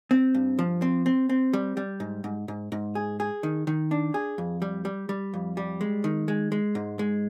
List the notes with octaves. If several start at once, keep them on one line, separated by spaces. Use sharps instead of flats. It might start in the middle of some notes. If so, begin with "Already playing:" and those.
C4
G2
F3
C4
C4
C4
G3
G3
G#2
G#2
G#2
G#2
G#4
G#4
D#3
D#3
D4
G#4
F2
G3
G3
G3
F2
G3
G#3
D#3
G#3
G#3
G#2
G#3